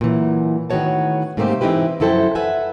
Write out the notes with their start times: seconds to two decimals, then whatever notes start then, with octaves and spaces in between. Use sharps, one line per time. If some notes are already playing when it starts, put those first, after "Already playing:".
0.01 A#2 D3 E3 F#3
0.70 A2 D#3 B3 F#4 C#5 A5
1.37 G#2 C3 A3 A#3 G4 C5
1.61 E3 C4 D#4 E4 G4 B4
2.00 F#2 F3 E4 A4 C5 G5
2.35 B4 E5 F#5 G#5